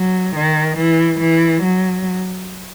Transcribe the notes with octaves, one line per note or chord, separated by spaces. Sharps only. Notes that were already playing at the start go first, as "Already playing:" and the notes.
Already playing: F#3
D#3
E3
E3
F#3